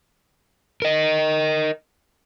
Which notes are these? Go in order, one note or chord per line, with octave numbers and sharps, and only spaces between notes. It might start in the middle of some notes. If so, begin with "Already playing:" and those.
A#4 D#5